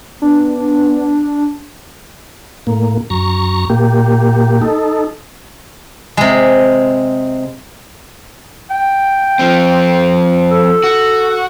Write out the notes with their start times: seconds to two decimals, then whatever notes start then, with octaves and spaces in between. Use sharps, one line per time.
0.22 B3 D4
2.67 A2 A#3
3.10 F#2 A#5 C#6
3.70 A#2 A#3 G4
4.62 D#4 A4
6.17 C3 G#3
8.71 G5
9.39 F3 C4
10.51 A4
10.84 F#4